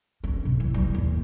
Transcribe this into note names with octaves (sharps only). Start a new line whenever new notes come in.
C#4
B2
E3
G3
D#2